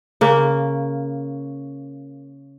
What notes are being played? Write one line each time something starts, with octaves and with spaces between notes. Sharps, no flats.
C#3 A#3